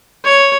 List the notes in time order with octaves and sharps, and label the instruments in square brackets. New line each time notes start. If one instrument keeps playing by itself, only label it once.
[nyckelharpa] C#5